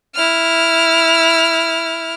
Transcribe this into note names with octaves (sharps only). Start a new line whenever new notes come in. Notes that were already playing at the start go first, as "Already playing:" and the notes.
E4 F6